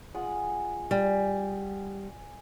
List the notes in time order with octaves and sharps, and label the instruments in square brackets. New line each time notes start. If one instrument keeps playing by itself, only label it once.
[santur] G#3 F4 F#5
[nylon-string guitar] G3 [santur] G#5